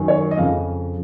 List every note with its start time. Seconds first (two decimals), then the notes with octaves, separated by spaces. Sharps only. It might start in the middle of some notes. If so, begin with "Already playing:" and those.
Already playing: F#2 D#3
0.08 C#5
0.31 D#5
0.38 F2 C#3 F3 F5